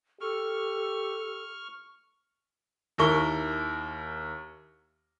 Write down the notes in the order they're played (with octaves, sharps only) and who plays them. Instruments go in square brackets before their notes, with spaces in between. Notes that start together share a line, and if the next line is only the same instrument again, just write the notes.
[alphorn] G4 [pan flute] A4 [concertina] C#6 F6
[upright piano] D#2 E4 A#4 C#6 G7